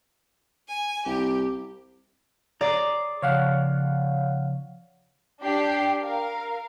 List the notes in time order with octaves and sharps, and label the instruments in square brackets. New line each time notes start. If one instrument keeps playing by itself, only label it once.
[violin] G#5
[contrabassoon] C2 [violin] G4
[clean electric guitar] G#4 A#5 [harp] D5
[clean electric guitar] C#3 F3 [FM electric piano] C#5 F5 F#5
[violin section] D4 G4 G5 C7
A#4 F5